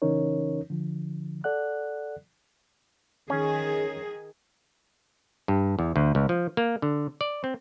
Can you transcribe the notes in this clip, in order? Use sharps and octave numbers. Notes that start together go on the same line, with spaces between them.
C#3 E3 C#4 D#4 A#4 C#5
D3 F3
A4 D5 F#5 F#6
D#3 C#4 G#4
G2
E2
D2
C#2
F3
A#3
D3
D5
C4